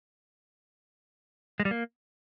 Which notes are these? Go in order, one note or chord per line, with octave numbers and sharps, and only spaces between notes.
G#3
G3
A#3